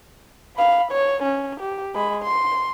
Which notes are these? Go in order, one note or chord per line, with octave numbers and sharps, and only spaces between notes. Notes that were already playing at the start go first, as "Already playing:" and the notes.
F5 B5
C#5
C#4
G4
G#3 B5
C6